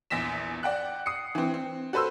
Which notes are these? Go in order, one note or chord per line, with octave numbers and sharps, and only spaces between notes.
A#1 E2 A#6 B6 E7
D5 F#5 G5 F#6
D#6 C7 C#7
E3 C4
C4
F#4 A4 B4 C5 C6 E6